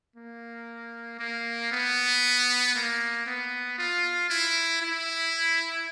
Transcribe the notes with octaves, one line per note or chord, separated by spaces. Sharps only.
A#3
A#3
B3
A#3
B3
F4
E4
E4